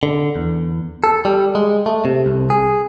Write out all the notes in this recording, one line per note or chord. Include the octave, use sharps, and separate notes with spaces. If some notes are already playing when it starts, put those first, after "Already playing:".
D3
E2
A4
G3
G#3
A3
C3
C2
G#4